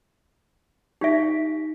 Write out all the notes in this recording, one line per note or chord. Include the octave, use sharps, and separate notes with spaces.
D#4 G4 E5 B6 D7